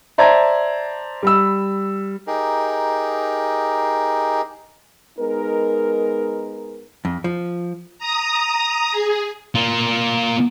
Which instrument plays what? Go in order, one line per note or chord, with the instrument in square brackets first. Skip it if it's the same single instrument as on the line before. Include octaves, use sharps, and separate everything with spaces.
[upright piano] C5 D5 E5 A5 A#5 G#6
G3 B5 E6
[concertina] D#4 G4 G#4 A#4
[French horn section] G#3 B3 D#4 A#4
[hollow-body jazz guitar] F2
F3
[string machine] A#5 D#6
G#4
[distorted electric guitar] A#3 F4